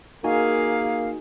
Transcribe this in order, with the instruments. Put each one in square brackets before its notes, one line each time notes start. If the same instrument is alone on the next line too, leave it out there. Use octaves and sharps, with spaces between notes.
[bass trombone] A#3 [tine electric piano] D#4 F#4 G#5 [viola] G#4 A#4 [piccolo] F5